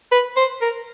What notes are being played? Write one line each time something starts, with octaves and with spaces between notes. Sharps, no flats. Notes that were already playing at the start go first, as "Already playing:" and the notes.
B4
C5
A#4